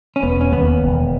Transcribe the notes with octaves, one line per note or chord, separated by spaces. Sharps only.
C#4
E1 B3
C#4
D#2 B3
E1